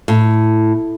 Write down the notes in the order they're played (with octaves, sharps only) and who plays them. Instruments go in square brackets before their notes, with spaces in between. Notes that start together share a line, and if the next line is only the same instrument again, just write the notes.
[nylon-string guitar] A2